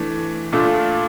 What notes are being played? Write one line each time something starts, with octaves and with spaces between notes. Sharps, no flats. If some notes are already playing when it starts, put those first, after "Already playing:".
Already playing: E3 A3 D4
A#2 A3 D4 F4